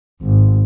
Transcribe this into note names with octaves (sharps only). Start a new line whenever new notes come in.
G#1